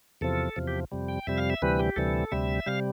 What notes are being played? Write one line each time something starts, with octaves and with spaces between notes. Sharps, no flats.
E2 C3 F3 A4
E2 C3 F3
G4
F2 C3 G3
G5
F2 C3 G3 E5
F5
E5
D2 C3 E3 G3 B4
G4
D2 C3 E3 G3 A4
D2 C3 G3 E5
C3 G3 F5